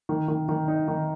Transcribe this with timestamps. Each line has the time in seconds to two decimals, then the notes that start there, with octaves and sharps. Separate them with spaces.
0.09 D#3
0.28 D#3
0.49 D#3
0.68 D#4
0.88 D#3